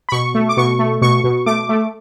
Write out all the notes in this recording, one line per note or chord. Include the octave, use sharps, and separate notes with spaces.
B5
B2 C#6
A3
D6
B2 C#6
A3
B2 C#6
B2
A3 D6
A3